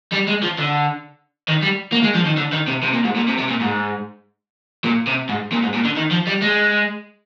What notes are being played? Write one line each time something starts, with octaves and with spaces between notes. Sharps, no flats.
G3
G#3
F3
D3
D#3
G3
A#3
G#3
F3
D#3
D3
D#3
C3
C3
A#2
G#2
A#2
C3
C3
A#2
G#2
A#2
C3
G#2
A#2
G#2
A#2
D3
D#3
F3
G3
G#3